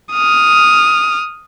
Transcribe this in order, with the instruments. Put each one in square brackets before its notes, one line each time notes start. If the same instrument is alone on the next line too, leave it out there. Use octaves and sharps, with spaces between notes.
[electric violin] D#6 F6